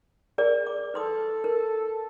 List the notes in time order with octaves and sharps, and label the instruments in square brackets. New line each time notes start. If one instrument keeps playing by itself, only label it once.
[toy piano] G#4 A#4 D5
D6
[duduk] A4 [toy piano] B4 C6 D#6
[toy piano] A#4